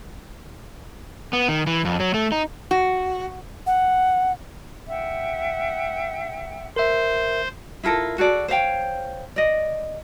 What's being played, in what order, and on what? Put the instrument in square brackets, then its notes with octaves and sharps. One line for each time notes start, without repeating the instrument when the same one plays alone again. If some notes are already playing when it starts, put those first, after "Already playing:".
[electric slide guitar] B3
D#3
E3
F2
F#3
A3
D#4
[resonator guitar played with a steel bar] F#4
[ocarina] F#5
[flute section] E5 F#5 G5
[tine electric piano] A#4 E5 [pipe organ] C5
[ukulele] E4 F4 A4 A#4
F#4 G#4 A4 D5
C5 C#5 F5 G5
D5 D#5